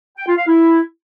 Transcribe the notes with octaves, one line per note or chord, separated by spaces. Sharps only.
G5
F4
F5
E4